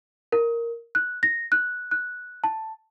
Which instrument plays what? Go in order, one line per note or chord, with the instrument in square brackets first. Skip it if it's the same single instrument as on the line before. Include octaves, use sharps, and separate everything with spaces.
[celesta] A#4
F#6
A#6
F#6
F#6
A5